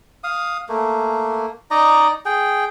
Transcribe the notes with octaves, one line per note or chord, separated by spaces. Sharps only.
F5 D#6
A3 A#3
D#4 D5 D#5 A#5
G#4 G5